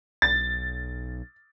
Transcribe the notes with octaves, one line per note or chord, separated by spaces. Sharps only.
B1 A6